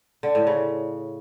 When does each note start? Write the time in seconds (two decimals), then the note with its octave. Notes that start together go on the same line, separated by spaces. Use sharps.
0.23 D3
0.35 A2
0.47 C#3